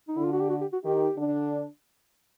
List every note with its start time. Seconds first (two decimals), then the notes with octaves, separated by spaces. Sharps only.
0.08 D#4
0.16 D3 D4 E4
0.24 F4
0.33 F#4
0.41 G4
0.50 F#4
0.61 G4
0.73 F#4
0.83 D#3 D#4 G4
1.17 D3 D4